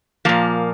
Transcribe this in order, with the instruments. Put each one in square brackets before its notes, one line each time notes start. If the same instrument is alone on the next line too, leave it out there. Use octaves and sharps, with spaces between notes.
[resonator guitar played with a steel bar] A#2 F3 A#3